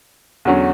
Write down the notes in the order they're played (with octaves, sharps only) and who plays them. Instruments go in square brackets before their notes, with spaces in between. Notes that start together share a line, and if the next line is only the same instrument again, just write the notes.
[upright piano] E2 D3 F#3 C#4